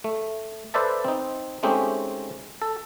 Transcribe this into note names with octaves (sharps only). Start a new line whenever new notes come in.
A3
A4 B4 C5 D5 E5 A5
C4 D#4
G#3 A3 C4 C#4 D#4 G4
A4